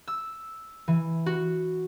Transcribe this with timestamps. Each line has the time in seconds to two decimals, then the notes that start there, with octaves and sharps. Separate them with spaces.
0.08 E6
0.88 E3
1.26 F#4